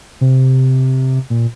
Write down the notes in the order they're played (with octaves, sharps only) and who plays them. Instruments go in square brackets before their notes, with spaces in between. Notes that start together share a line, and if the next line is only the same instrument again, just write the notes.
[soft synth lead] C3
A#2